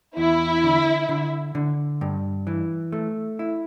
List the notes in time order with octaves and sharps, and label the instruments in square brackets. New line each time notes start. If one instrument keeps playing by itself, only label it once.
[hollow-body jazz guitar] E2 [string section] E4
[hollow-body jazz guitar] D3
D3
D3
G2
E3
A3
E4